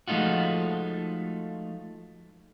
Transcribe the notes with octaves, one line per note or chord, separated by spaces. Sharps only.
F3 G#3 A3 D#4 F4 F#4